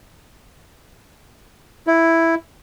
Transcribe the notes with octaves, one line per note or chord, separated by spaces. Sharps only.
E4